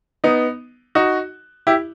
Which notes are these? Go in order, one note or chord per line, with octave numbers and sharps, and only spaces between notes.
B3 D#4
D#4 F#4
E4 G4